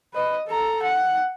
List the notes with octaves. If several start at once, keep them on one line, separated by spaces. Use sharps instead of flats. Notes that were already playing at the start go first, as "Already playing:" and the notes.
B4 D#5
A4 A#5
F#5